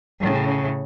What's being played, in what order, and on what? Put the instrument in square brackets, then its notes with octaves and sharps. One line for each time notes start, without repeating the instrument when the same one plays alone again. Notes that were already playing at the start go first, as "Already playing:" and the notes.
[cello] A2 C#3